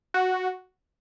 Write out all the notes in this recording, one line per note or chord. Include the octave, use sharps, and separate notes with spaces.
F#4